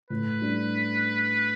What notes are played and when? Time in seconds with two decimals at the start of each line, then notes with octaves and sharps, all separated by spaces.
0.10 A2 B4
0.41 G3 D4